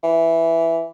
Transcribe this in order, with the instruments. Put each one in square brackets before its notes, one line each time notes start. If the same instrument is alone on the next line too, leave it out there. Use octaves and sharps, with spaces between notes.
[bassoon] E3